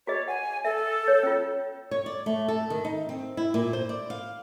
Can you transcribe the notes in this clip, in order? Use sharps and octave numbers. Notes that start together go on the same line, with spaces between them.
F#4 G#4 C#5 D#5
F#5 G#5
A4 E5
C#5
C#4 F4
C#5
D5
A3
A4
D#3
D#4
C4
E4
A#2
C5
D5
F5